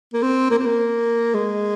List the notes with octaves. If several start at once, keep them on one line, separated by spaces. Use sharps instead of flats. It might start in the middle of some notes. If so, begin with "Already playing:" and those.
A#3
C4
A#3
C4
A#3
G#3